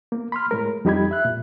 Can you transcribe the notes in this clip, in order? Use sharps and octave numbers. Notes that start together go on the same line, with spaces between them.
A#3
B5 C6 F6
A2 G#3 A#4
F2 G3 D#4 G4 B5 G#6
E5 F#6
A#2